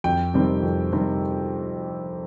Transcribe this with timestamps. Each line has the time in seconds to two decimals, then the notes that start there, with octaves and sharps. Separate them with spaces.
0.04 F2 G5
0.34 C3 D#3 G3 C4
0.63 F2
0.92 C3 D#3 G3 C4